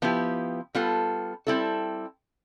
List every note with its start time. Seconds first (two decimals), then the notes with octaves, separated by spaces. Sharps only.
0.02 F3 B3 E4 G4
0.75 G3 B3 F4 A4
1.47 G3 C4 E4 A4